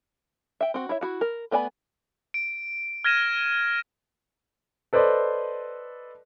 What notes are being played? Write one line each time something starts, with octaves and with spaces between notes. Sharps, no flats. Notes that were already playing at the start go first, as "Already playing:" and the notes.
E5 G5
C4 F#4
E4 C#5 E5
E4 F#4 F#5
A#4
A3 B3 D5 G#5 B5
D7
F6 G#6 A#6 D#7 E7
A4 B4 C5 D5 D#5